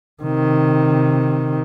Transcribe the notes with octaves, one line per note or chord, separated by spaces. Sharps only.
C3 D#3